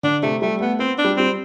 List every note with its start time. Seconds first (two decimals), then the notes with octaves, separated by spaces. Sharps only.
0.03 D3 D4
0.23 C3 A3
0.42 G3 A3
0.60 A3 B3
0.79 B3 C4
0.98 D4
1.04 G3
1.17 G3 C4